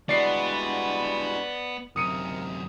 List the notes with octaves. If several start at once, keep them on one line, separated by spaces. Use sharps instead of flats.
G3 G#3 B3 D4 E4 F#4 D5 C7
F#2 C3 A#4 D#6 C#7 D#7